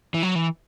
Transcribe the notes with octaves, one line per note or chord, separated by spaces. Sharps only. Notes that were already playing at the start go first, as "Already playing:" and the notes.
E3
F#3
E3